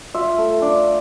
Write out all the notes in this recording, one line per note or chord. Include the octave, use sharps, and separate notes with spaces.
F4 E5
A3
D4